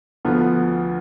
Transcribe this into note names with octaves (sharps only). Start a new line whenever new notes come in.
D2 D3 F3 B3 F4